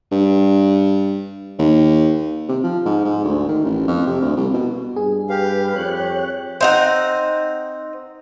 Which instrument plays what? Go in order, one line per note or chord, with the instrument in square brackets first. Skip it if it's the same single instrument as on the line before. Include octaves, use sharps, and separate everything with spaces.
[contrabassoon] G2
D#2
C3
F3
G#2
G#2
D2
D#3
A1
F2
C3
D2
C2
B2
[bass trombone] G2 [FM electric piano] G#4
[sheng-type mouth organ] G4 F5 [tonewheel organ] B4
[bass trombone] F2 [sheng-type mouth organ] G4 [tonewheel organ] C#5 F#6
[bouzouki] C4 D#4 F#5